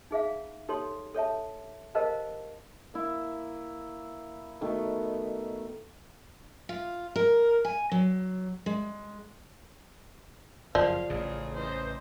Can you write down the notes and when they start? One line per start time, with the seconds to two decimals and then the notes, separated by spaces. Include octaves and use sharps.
0.11 D#4 G#4 E5 F5
0.69 D#4 G4 A4 C#5 C6
1.14 A4 C#5 E5 A5
1.95 G4 A#4 C5 D#5 F5 A5
2.94 A#3 E4
4.61 B2 D#3 A3
6.69 F4
7.16 A#4
7.65 G#5
7.92 F#3
8.66 G#3
10.75 F#1 F2 F3 D5 F5
11.10 A1 C#3 F4 G#4
11.55 E3 C5 D#5